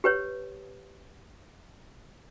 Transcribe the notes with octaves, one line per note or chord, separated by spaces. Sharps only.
G4 B4 C#5